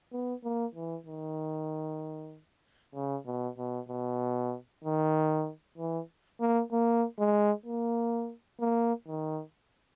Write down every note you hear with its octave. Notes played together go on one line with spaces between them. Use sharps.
B3
A#3
E3
D#3
C#3
B2
B2
B2
D#3
E3
A#3
A#3
G#3
A#3
A#3
D#3